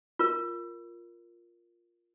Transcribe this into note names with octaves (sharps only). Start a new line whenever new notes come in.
F4 A#4